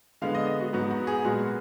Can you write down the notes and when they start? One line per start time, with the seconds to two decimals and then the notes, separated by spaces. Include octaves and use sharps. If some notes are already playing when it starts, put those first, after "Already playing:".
0.22 D3 G#3 B3 F5
0.35 D#5
0.47 D#5
0.60 F#4
0.73 G#2 F#3 B3 F#4
0.90 F#4
1.07 G#4
1.24 A#2 G#3 B3 F#4